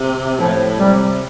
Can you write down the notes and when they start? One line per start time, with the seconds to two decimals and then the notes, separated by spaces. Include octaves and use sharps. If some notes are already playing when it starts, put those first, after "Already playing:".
Already playing: C3
0.39 A2 F3
0.79 C3 G3